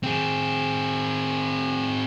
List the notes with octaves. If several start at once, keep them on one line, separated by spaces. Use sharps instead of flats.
C4 G#4